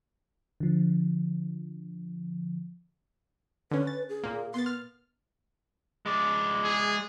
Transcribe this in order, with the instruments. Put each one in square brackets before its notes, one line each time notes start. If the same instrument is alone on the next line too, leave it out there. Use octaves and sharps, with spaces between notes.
[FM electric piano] D3 F3
[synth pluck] D3 C#4 [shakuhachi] B4
[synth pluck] A6
[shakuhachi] G#4
[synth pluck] A#2 A#3
[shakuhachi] B3 [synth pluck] C6 A6
[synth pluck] F6
[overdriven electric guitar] G#3 D5
[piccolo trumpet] G#4